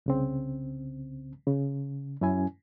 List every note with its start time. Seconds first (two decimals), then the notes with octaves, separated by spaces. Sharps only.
0.06 C2 C#3 C4
1.47 C#3
2.21 F#2 C#4 E4 G#5